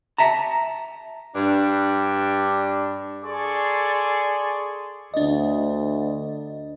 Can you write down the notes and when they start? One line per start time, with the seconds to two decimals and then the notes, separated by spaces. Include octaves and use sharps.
0.18 E5 A5 A#5
1.35 G2 D4
3.24 G#4 A4 D5 C6 C#6
5.14 D2 D4 D#5